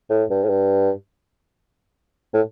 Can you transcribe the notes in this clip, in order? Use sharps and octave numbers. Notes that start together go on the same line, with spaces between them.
A2
G2
A2
G2
A2